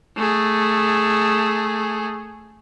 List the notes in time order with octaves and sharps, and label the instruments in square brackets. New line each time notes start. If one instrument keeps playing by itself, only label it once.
[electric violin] A3 G#4